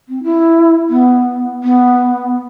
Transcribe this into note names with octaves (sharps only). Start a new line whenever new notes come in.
C4
E4
B3
B3